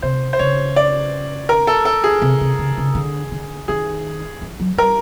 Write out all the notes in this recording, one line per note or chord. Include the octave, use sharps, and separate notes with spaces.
C3 C5
C5
C#3 C#5
D5
A#4
A4
A4
G#4
C3
C3
C#3
C#3
D3
D3
D#3 G#4
E3
F#3
G3 A#4